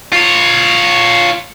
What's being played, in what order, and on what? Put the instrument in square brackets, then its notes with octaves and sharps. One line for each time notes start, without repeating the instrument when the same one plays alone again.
[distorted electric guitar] F4 C#5